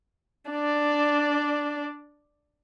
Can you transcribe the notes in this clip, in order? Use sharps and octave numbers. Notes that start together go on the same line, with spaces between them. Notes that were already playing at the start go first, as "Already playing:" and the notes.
D4 D5